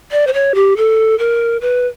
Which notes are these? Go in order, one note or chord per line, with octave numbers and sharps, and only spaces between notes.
D5
C5
C#5
G4
A4
A#4
B4